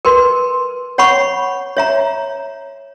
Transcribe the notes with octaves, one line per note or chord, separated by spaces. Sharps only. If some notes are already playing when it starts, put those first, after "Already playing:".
A#4 B4 C6
C#5 F#5 B5 C#6
C#5 E5 A#5